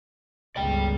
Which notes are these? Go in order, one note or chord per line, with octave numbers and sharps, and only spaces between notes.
G1 C#2 D5 G5